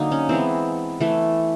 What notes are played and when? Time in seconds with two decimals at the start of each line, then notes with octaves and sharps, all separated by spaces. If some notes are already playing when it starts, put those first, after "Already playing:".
Already playing: D3 F#3 A#3 D#4
0.12 C#4
0.29 E3 G#3 B3 C4
1.01 E3 A3